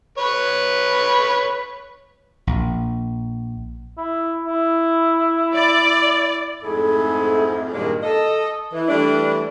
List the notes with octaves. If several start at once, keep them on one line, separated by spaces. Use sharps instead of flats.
B4 C#5
A#1
E4
E4
D5
F2 G#2 A3 E4 G#4 A4
G2 A#2 D#3 G#3 A#3 D4
A4 D#5
E3
E3 G3 A3 D4